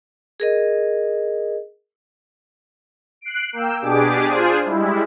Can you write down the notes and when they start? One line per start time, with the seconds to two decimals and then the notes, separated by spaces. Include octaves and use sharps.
0.40 G#4 A#4 D#5
3.21 F#6 C7 D7
3.53 A#3 G5 E6
3.81 B2 D4 G4 G#4 D6
4.29 D4 F4 G#4 C5
4.66 G3 G#3 E4